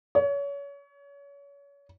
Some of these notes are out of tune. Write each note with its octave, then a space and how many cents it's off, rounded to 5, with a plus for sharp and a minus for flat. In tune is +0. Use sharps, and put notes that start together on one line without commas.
C#5 +30